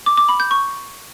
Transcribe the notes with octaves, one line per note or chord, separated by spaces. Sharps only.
D6
D6
B5
G6
C#6